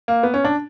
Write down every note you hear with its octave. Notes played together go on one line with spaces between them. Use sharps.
A#3
B3
C#4
D4